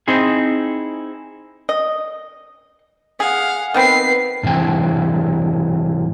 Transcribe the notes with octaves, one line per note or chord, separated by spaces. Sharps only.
C4 D#4 E4 G#4
D#5
G#4 F5 F#5
D#3 B3 C4 B4 C7
G#2 C3 E3 G5